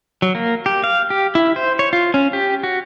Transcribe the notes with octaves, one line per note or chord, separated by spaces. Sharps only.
F#3
A#3
G4
F5
G4
E4
C5
C#5
F4
C#4
G4
F#4